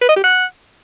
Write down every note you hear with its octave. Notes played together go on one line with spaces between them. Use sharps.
B4
D#5
G4
F#5